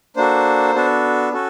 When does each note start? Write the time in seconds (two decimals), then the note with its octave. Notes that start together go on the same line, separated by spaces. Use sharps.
0.16 A#3 D4 F#4 A4 C5
0.74 B3 D4 F#4 A4
1.33 C#4 F#4 A4